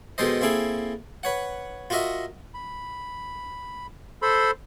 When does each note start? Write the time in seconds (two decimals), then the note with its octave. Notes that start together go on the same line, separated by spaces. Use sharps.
0.18 B2 D#3 G#3 A4 C5 D#5
0.41 A#3 C4 E4 G#4 A4
1.23 B4 C#5 F#5
1.90 F4 F#4 A#4 D#5 E5
2.54 B5
4.22 A4 C5 B5 C6